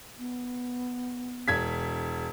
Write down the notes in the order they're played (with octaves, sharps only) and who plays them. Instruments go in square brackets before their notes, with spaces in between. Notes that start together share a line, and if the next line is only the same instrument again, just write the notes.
[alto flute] B3
[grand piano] E1 G#6 B6